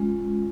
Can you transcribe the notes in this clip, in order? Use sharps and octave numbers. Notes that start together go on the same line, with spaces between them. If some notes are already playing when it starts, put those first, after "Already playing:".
Already playing: G#3 C#4 F4